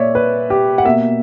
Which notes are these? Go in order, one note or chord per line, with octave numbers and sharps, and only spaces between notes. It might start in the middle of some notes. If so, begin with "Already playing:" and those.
Already playing: A#2 A#3 C#5 D5 E5
B4
G4
F#5
B2 A#3 E5